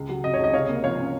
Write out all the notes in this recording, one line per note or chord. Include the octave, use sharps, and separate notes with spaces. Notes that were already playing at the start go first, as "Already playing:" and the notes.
Already playing: C#2
F#3
C3 D#5
C#5
C#2
D#5
C3 C#5 F5
A#3
F3 C#5 F5
C#4